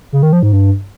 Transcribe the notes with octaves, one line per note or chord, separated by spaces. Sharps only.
C#3
D#3
F3
G#2
G2